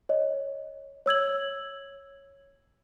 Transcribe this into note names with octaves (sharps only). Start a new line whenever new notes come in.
C#5 D#5
C#5 E6 G#6 F#7